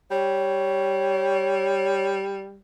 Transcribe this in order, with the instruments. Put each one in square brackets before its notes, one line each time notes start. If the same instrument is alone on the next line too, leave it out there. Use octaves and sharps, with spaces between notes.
[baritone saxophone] G3 [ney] C#5